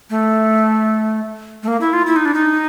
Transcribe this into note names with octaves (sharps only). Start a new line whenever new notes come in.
A3
A3
A#3
E4
F4
E4
D#4
D4
D#4